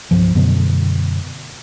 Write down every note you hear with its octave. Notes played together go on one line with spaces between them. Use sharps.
C2 G2 F3
F#2 B2 D3 A3